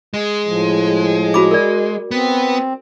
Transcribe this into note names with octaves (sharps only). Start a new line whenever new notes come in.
G#3
A2 F3
F#4 B5 D6
A#4 D5
B3 C4